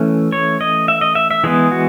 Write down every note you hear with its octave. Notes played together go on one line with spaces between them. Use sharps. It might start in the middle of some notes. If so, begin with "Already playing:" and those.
Already playing: E3 A3 C#4
C#5
D#5
E5
D#5
E5
E5
E3 G#3 B3 G#4
F#4